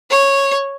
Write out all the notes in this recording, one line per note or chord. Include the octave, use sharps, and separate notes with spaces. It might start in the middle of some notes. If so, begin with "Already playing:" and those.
C#5